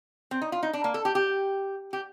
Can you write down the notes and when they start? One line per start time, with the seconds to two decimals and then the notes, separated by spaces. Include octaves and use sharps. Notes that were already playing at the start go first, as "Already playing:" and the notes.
0.31 C4
0.42 D#4
0.52 F4
0.63 D#4
0.73 D4
0.84 A#3
0.94 A4
1.05 G4
1.15 G4
1.93 G4